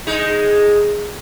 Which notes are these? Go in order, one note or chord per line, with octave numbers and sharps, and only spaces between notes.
G#3 D#4